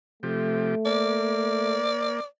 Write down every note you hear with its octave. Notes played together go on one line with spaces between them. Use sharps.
C3 F3 A3 G4
A#3 D5